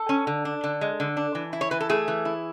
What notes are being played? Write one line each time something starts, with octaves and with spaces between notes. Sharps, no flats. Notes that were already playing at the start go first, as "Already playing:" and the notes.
Already playing: A4
C#4
D3
D4
D3
G#3
D3
D4
E3
E4
C#5
E3 B4
A4
A3 G#4
E3
E4